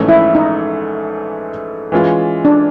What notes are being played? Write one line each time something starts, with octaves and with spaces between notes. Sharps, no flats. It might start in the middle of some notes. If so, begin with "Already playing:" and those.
Already playing: A#1 G#2 E3 A3 C#4
E4
D#4
E3 G#3 C#4 F4
D4